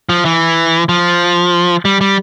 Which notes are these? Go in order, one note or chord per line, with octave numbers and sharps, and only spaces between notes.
F3
E3
F3
G3
G3